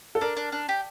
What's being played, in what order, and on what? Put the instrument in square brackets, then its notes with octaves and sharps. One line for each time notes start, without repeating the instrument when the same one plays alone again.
[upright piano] A4
[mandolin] D4 [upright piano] A#4
[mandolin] D4
D4
G4